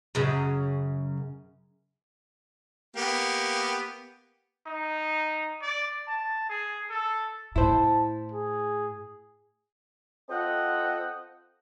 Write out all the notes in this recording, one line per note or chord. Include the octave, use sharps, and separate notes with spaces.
F#2 C#3
A#3 B3 G4
D#4
D5
A5
G#4
A4
A2 E4 C5 A5
G#4
C4 F4 A4 D#5 F#5 G5